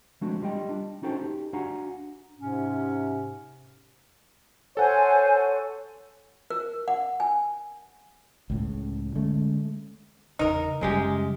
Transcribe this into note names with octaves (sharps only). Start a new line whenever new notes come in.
F3 G#3 A3 C4 D4 F#4
G3 F4 D#5 G5
D4
C#4 D#4 F#4 A4 C5 G5
D#4 G4
D4 F#4 F5 F#5 G#5 A#5
G#2 C3 C#4
A4 C5 C#5 F#5 G#5
A#4
F#5
G#5
C#2 A2 C#3
D3 G#3 A3 C#4
E2 C#3 D#4 A#4
F#2 C#3 G3 G#3 G4